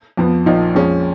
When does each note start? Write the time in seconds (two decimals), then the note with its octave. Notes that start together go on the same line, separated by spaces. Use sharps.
0.17 F2 F3 B3
0.46 A#1 A#2 F3 A#3 D#4
0.75 F2 F3 G#3 C#4